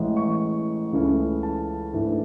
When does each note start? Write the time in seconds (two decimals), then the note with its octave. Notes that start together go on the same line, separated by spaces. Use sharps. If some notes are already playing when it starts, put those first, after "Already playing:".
Already playing: A1 A2 E3 G#3
0.17 C#6
0.92 C#2 C#3 E3 A3 C#4
1.43 A5
1.93 G#2 E3 A3 D4